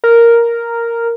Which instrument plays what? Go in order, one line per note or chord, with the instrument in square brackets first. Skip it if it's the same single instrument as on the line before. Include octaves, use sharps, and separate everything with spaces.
[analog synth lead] A#4